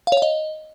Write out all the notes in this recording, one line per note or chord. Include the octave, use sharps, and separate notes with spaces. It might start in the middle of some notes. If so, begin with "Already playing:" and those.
F5
C#5
F5
D#5